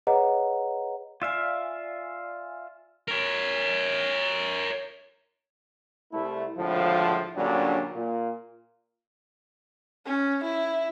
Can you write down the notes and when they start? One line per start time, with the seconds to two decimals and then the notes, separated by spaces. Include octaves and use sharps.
0.07 G#4 B4 C#5 D#5 F#5 A#5
1.22 F4 D5 E5 F5 G#5
3.08 A#4 C#5
6.12 C2 A3 E4
6.57 G#1 A2 D3 F3
7.36 A#2 D3 F#3 G3 C#4 D4
7.95 A#2
10.06 C#4
10.45 E4